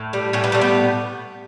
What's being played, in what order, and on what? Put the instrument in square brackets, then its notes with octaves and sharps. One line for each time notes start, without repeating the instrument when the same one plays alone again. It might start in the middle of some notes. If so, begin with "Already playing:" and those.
Already playing: [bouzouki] A2
G3
A2 C#4
B3
G3 A3
B3